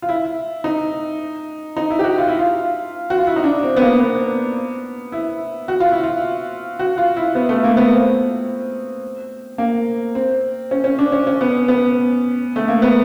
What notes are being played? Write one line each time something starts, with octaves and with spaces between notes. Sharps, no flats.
F4
E4
D#4
D#4
E4
G4
F#4
F4
E4
F4
F#4
F4
E4
D#4
D4
C4
B3
A#3
B3
E4
F#4
F4
E4
F4
F#4
F4
E4
B3
A3
A#3
B3
C4
A#3
C4
C#4
C#4
D4
C#4
C#4
B3
B3
A3
A#3
B3